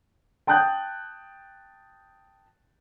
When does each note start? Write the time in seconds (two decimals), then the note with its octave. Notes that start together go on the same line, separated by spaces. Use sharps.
0.47 G5 A5 D#6 F#6 G6